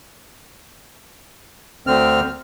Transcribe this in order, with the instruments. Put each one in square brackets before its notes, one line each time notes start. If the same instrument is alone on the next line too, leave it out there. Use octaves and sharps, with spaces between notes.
[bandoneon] D2 D3 C4 F6